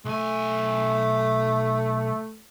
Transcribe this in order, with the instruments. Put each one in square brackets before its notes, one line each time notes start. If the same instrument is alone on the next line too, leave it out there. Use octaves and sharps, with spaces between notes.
[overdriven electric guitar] B1 G#5 [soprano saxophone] A3